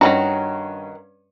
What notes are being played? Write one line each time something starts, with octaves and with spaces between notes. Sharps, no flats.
G2 D#3 E3 C#4 F#4 A#5